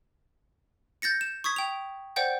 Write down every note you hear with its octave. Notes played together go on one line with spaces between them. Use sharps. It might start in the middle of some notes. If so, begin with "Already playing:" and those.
G6 A6 A#6 C#7
E7
C#6 D#6 G#6 B6
G5 F7
C5 D5 F#5 G5 G6